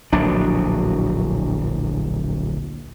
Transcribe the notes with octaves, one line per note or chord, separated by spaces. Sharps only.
D1 A#1 F#3 D4